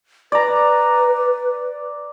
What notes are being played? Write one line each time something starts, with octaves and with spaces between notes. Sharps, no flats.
B4 D5 A#5